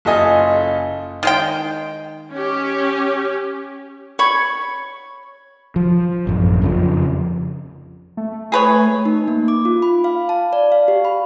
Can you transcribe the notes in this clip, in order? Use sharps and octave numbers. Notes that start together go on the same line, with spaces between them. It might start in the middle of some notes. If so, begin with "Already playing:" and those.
F#1 F4 A4 D#5 G#5
D#3 G#3 G5
C#4 G4
C#5 B5 C#6
F3
A1 F#2
F2 C#3 F3
A3
G#4 B4 C#5
D#4
A#3
D6
F4
B5
F5
A5
D5
F5
G4
B5